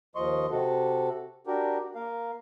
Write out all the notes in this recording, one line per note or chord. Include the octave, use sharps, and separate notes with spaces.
D#2 F3 D#5 C6 C#6
C3 F#4 A4
D4 F#4 G4 A#4
A#3 A#4 F5